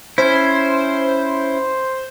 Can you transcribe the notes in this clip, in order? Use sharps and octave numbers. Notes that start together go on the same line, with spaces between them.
C#4 E4 C5